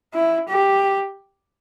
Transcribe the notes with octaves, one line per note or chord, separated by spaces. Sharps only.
E4
G4